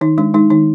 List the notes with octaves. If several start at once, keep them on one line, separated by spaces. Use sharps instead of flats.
D#3 D#4
G#3 D4
G#3 D#4
D#3 D#4